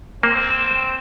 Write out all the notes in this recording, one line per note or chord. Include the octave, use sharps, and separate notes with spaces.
A#3 C4 E7